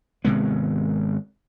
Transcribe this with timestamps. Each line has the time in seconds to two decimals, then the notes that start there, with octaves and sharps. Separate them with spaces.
0.25 G#1 C3 G#3 B3